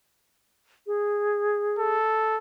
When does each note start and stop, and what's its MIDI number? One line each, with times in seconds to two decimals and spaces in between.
0.87 1.97 68
1.79 2.38 69